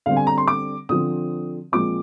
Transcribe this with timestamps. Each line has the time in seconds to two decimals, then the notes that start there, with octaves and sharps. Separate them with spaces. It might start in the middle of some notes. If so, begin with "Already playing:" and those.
0.06 D3 G3 C4 F5
0.16 G#5
0.27 A#5
0.38 C6
0.48 D6
0.89 D3 F3 C4 D#6
1.72 A#2 F3 G#3 C4 D6